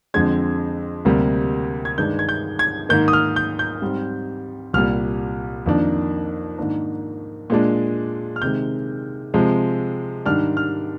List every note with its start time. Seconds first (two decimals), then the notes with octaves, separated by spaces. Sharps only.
0.14 F2 D3 G#3 C4 G#6
1.05 D2 C3 G3 A#3
1.85 G#6
1.98 G2 D#3 G#3 D4 G6
2.19 G#6
2.29 G6
2.59 G#6
2.89 G#2 D#3 A#3 G6
3.08 D#6
3.13 F6
3.36 G6
3.59 G6
3.82 G#2 G3 C4
4.73 C2 A#2 G3 F6
5.66 F2 D#3 A#3 D4
6.58 G#2 D#3 A#3 D4
7.50 A#2 G#3 D4
8.36 F6
8.42 C3 D#3 G#3 G6
9.34 C3 F3 G#3
10.25 G#2 D#3 G3 D4 F6
10.57 F6